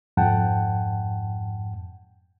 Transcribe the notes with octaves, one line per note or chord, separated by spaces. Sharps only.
F2 G#2 F#5 G5 A5